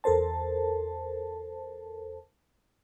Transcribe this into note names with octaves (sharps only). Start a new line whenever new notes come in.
E2 A4 A#4 C5 A5